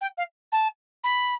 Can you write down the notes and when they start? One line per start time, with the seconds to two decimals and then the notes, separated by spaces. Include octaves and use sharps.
0.01 G5
0.17 F5
0.52 A5
1.04 B5